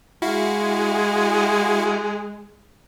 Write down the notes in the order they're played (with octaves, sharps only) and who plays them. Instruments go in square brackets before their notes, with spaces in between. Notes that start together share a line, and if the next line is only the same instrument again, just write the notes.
[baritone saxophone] G#3 [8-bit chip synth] E4 F#4 F5